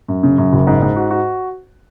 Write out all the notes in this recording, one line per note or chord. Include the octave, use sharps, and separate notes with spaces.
F#2
C#3
F#2
F#1
G#2
G#2
F#4
F#4